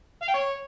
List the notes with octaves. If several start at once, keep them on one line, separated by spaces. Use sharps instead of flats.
F5
G5
C#5